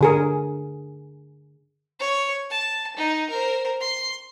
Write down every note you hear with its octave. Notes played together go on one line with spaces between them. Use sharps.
D3 G#4 A#4
C#5
A5
D#4
A#4 C5
C6